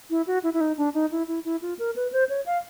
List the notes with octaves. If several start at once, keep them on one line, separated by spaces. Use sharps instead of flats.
E4
F#4
E4
E4
D#4
D4
D#4
E4
E4
E4
F4
A#4
B4
C5
C#5
F5